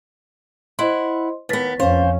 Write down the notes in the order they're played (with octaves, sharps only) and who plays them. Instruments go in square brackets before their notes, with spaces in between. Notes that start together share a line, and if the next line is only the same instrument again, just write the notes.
[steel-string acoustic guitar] E4 F#5 [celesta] C5 D#5 C6
[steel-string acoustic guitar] D#2 B3 [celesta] B4 A6 B6
[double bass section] F2 C#4 [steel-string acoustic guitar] C5 [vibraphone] F5